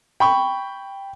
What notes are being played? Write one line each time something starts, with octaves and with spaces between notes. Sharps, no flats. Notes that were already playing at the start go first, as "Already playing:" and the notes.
G5 B5 C#6